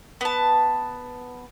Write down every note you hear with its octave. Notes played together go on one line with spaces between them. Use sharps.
B3 A5